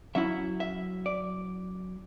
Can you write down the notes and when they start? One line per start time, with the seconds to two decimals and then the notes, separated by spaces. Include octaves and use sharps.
0.15 F#3 C#4 E4 E5
0.60 E5
1.06 D5